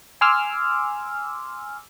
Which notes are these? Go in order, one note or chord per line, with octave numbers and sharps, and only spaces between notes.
G#5 C6 D6 E6 F6